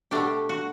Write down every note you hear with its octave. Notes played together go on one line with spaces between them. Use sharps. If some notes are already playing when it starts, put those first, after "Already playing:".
B2 A3 D4 G4
F#4